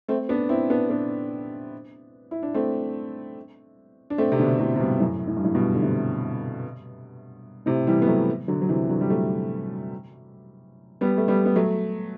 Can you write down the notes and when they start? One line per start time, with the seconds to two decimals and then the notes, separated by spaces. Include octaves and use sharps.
0.08 A3 C4
0.29 B3 D4
0.49 C4 E4
0.70 B3 D4
0.90 B3 D4
2.31 E4
2.43 D4
2.54 A3 C4
4.10 D4
4.18 A3 C4
4.32 C3
4.39 B2 D3
4.59 A2 C3
4.76 C3
4.80 G2 B2
5.00 F#2 A2
5.27 A2
5.37 G2
5.44 F#2 A2
5.55 G2 B2
5.74 D3
5.82 A2 C3
7.66 A2 C3
7.87 E3 G3
8.02 B3
8.07 F#3 A3
8.48 D3 F#3
8.62 F#3
8.69 C3 E3
8.89 D3 F#3
9.01 G3
9.10 F#3 A3
11.01 G3 B3
11.17 A3
11.28 G3 B3
11.45 B3
11.56 F#3 A3